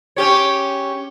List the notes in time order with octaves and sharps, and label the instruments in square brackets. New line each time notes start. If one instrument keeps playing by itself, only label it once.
[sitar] C#4 G4 C#5